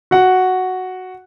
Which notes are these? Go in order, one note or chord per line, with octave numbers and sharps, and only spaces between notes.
F#4 F#5